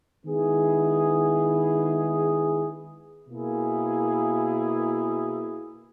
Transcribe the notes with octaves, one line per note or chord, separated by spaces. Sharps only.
D#3 G#3 B3 E4 G#4
B2 A#3 E4 G#4